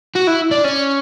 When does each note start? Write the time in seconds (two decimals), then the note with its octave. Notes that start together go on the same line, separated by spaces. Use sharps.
0.15 F#4
0.27 E4
0.51 D4
0.64 C#4